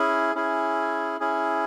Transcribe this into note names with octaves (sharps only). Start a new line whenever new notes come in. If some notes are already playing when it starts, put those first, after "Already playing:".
Already playing: C#4 E4 G#4
C#4 E4 G#4
C#4 E4 G#4